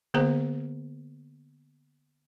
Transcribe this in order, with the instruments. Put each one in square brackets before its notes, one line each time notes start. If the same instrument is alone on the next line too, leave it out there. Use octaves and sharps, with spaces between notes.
[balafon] D3 A#3 B3 G#4 C5 A#5